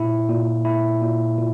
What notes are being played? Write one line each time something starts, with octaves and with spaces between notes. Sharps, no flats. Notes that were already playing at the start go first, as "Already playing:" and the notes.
Already playing: A#2 E4
A#2
E4
A#2
A#2